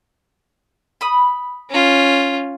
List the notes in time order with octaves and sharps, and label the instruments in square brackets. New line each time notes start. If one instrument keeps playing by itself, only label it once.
[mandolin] B5 D#6
[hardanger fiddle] C#4 F4